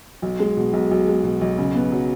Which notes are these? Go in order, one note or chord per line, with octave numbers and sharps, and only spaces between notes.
B1
G#3
B2
B1
B1
G#3
B2
B1
C#3
B3
F#3